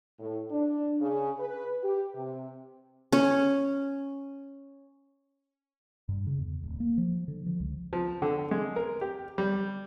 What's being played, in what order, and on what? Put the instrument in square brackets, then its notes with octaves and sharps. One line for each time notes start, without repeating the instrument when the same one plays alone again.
[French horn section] A2
D4
C#3
B4
G4
C3
[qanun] C#4 C#5
[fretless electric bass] G2
C#3
E2
D1
A#3
F3
D3
F3
C#2
[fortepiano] F3
D3
G#3
A#4
G4
G3